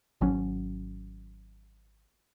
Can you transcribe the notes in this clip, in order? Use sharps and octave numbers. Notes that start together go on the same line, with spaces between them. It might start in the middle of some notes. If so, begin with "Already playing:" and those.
G#1 F#3 C#4